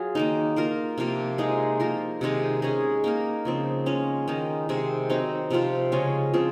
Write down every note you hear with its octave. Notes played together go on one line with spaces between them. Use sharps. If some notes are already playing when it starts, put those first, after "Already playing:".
Already playing: F#3 F4 G#4
D#3 A#3 D#4
A#3 F4 A#4
C3 F3 A#3 F4
G#3 D#4 G#4
F3 A#3 F4 A#4
C3 D#3 G#3 D#4
G#3 C#4 G#4
A#3 D#4 A#4
C#3 F3 C4
G#3 C#4 F4
D#3 G#3 D#4
C3 D#3 G#3 C4
F#3 C4 D#4
C3 F3 C4 F4
C#3 G#3 C#4 F4
C#3 F3 C4 F4